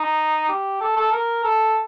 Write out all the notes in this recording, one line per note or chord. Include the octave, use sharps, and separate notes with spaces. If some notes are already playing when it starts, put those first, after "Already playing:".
Already playing: D#4
G4
A4
A4
A#4
A4